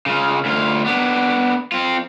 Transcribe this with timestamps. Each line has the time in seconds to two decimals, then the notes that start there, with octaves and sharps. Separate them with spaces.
0.06 C#3 F4
0.45 D2 F4
0.86 B3 D4
1.72 C4 F4